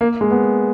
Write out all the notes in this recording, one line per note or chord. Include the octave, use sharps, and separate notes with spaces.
A#3
G#3
B3